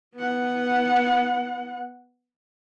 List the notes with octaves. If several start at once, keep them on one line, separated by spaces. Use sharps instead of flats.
B3 F#5